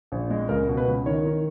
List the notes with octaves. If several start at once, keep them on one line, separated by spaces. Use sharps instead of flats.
A#1
G#3
C#2 A#4
B2
B4
C#2
D#3 C#5
D#3